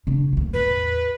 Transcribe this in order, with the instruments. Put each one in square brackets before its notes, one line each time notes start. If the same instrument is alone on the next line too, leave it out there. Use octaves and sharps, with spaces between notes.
[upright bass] C#3 D4
D2 A#3
[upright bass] A1 E2 [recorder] B4